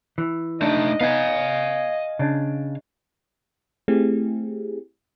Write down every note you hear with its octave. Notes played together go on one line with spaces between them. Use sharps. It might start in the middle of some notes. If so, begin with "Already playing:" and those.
E3
A3 D4 D#4 D#5
B3 D#4 F5 G#5
C#3 D4
A3 C4 E4 G4 G#4